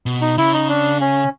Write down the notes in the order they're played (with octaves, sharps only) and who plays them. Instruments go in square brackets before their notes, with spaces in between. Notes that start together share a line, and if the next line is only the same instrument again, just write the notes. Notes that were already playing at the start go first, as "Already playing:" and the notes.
[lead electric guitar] B2
[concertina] D#4
[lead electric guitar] C#3 [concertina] E4
[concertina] D#4
D4
C#4